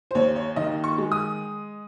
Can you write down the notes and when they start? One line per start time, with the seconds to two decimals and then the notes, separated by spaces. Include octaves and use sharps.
0.11 C5
0.15 D#2 C#5
0.36 C#5
0.56 D#3 D#5
0.84 C#6
0.98 G#3
1.12 D#6